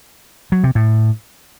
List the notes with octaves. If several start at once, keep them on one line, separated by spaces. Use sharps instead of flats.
F#3
C3
A2